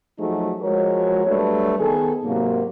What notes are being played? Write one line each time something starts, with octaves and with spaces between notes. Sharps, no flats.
F3 F#3 A3 D#4 F#4 G#4
F3 G#3 F#4 A#4 C#5
F#3 G3 A3 D4 B4 C#5
D#3 B3 G#4 A4
G#2 C3 F#3 A#3